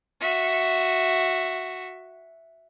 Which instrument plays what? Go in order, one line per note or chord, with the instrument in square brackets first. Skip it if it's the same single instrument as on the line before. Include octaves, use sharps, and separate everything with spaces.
[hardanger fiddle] F#4 E5